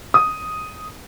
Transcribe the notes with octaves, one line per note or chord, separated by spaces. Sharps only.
D#6